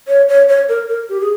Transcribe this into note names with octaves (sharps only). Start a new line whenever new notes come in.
C#5
C#5
C#5
A#4
A#4
G4
G#4